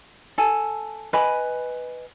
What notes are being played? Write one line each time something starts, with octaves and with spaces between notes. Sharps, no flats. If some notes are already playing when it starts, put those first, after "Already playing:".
A4 G#5 A5
B4 D#5 G#5 B5